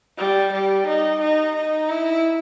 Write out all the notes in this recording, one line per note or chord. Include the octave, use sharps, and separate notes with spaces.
G3
G3
D#4
D#4
D#4
E4